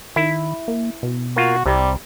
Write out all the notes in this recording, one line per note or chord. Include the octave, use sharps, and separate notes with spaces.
D#3 E4
A#3
B2
A#3 F4 F#4
C2 C3 G3